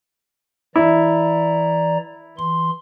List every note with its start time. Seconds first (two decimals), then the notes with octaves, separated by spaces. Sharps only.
0.76 E3 E4 D5 A#5
2.38 E3 C6